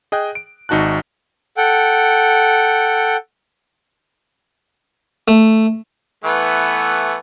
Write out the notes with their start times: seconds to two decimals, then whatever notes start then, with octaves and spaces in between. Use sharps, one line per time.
0.12 G#4 D#5 G5 F#6
0.35 D7
0.69 G#1 D#4 F#4 A5 F#6
1.57 A4 F#5 G5
5.28 A3
6.24 E3 A3 B3